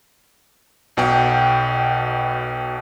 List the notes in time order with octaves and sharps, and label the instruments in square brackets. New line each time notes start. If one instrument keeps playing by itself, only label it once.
[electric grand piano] B1 B2 F#5 G5